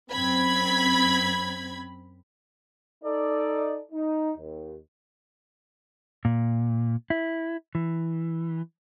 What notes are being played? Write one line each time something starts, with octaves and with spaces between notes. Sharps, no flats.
F#2 C4 B5 G#6
D#4 A4 D5
D#4
D#2
A#2
E4
E3